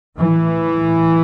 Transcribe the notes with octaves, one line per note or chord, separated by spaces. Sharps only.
A2 E3